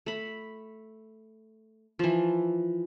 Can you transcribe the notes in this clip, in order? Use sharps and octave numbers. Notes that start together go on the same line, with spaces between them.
A3 B5
E3 F3